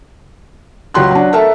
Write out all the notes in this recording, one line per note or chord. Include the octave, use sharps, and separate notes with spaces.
C#2 F#3 G4 C6 F#6
F#3 D4
A4 A#4 E5 A5